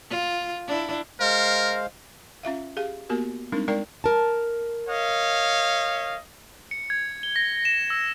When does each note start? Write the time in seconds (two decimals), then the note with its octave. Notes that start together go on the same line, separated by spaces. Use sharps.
0.10 F4
0.67 D4 E4
1.20 G#3 A#4 C5 F5
2.43 C#4 F4 E5 F5
2.76 G4 G#4 F5
3.09 A#3 B3 F#4 G4 A#4
3.52 G3 G#3 C4 D4 D#4 A#4
3.68 G#3 D#4 A#4 D5 G5 A#5
4.04 A#4 A5
4.89 C#5 D#5 F5
6.71 C#7
6.90 G#6
7.23 G7
7.36 A#6
7.65 E7
7.90 E6